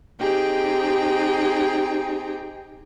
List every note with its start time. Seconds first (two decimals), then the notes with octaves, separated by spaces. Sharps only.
0.19 C4 D#4 G4 G#4 G5